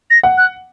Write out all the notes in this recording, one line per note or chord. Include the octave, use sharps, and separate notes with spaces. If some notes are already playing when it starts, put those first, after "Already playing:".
A#6
F#5
F#6